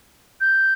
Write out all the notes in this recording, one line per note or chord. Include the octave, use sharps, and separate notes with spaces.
G6